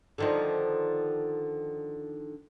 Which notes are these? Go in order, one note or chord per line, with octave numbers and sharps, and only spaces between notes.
D3 D#3 F3